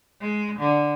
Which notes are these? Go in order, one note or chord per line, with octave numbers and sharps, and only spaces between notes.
G#3
D3